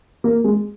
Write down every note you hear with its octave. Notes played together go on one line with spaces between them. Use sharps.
A#3
G#3